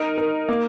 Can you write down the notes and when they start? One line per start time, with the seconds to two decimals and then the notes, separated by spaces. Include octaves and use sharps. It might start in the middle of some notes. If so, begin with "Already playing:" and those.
Already playing: D#4 A#4
0.18 A#4
0.49 A#3